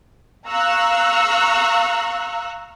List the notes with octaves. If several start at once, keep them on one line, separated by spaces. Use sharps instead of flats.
F5 A#5 C#6 E6 F#6